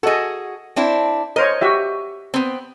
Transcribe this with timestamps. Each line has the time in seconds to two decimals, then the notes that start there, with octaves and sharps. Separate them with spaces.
0.03 F#4 G#4 A4 D#5
0.76 C4 D4 E4
1.36 A#4 C5 C#5 D#5
1.61 F#4 G4 E5
2.34 B3 C4